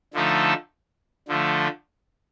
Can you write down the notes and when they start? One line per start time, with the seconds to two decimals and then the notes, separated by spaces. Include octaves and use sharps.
0.13 D3 F3 A3 D#4 A4
1.28 D3 F3 A3